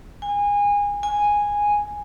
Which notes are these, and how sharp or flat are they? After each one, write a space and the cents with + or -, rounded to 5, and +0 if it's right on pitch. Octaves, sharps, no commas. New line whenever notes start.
G#5 -25
G#5 -10